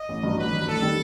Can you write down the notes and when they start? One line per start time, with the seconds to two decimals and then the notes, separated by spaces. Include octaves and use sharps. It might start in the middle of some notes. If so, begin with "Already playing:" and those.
Already playing: D#5
0.09 A1
0.23 G2 F#3
0.38 A1 B4
0.52 G2 F#3
0.67 A1 A4
0.82 D#3 G3